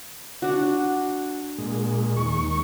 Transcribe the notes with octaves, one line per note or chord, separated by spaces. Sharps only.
D4 F#4
A#2 G#3
D#2 C#6